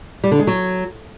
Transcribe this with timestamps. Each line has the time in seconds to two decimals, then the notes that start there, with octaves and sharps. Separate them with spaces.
0.24 G3
0.31 D3
0.39 G#3
0.47 F#3